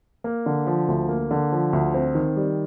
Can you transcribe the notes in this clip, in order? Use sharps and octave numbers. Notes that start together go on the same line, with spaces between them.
A#3
D3
F3
D2
A#3
D3
F3
D2
C4
D#3
G3